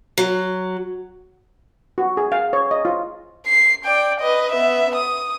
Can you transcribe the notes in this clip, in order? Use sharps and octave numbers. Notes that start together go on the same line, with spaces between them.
F#3
F#4
G#4
F5
C#5
D#5
F4
C7
D5 G5
B4 D#5
B3 E5
D#6